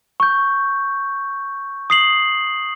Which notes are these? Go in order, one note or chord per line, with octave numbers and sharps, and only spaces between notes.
C#6 G6
D#6 C7 F#7